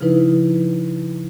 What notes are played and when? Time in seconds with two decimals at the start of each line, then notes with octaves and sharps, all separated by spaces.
0.01 C#3 F3 D#4 E4 B4